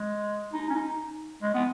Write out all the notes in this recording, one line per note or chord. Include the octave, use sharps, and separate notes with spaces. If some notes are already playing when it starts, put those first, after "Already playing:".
Already playing: G#3
D#4
C#4
D#4
G#3
B3